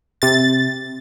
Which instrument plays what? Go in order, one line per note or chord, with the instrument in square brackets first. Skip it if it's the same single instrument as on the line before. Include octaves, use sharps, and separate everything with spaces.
[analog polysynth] C3 A6